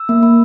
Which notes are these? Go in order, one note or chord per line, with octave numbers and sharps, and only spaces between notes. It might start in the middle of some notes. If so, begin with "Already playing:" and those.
Already playing: E6
A#3
A#3